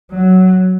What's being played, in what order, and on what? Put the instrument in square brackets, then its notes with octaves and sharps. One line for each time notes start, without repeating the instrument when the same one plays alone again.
[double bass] F#3